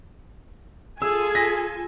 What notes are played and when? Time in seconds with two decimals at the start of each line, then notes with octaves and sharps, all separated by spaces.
1.02 F4 G#4 A4 G#5 E6
1.35 A#6 B6